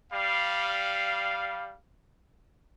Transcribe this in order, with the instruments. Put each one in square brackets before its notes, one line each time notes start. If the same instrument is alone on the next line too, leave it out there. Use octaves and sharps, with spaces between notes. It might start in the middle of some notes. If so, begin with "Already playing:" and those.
[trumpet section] G3 F5